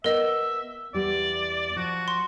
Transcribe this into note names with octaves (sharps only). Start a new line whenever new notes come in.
B3 A#4 D#5 E5
E2 G3 D5
F3 F#4
C6